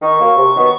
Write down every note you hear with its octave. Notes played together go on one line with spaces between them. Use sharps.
D#3 C#6
F#3 A#3
C3
D#3 F#3 B3